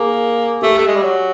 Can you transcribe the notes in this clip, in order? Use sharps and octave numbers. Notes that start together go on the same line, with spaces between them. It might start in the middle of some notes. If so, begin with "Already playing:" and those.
Already playing: A#3 G#4
A3 G4
A3
G#3
G3
F#3